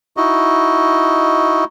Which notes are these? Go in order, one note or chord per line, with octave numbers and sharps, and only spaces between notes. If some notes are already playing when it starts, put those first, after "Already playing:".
D#4 E4 F#4 D#5